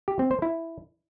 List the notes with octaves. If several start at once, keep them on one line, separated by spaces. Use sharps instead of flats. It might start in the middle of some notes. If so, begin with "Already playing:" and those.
G4
C4
C5
E4